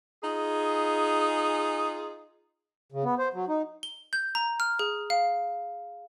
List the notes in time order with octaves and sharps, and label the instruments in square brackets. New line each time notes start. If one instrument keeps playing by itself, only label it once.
[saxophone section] D#4 F4 G#4
[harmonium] C#3
B3
C5
F#3
D#4
[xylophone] G7
G6
A#5
F6
G#4
F5